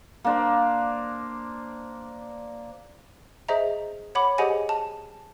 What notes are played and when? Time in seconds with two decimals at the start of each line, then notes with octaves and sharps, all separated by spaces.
0.24 A#3 D4 C5
3.49 G#4 C5 D#5 E5 A#5
4.15 C#5 F#5 B5 D6
4.38 G4 G#4 C5 D#5 F#5 G#5
4.69 A5